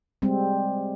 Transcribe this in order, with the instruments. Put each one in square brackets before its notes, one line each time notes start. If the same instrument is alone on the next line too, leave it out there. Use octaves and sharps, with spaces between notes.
[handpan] G3 G#3 C4